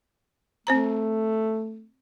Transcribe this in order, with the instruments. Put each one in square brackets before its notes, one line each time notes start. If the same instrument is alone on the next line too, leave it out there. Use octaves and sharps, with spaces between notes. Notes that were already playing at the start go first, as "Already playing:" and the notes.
[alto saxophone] A3 [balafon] C4 C5 A#5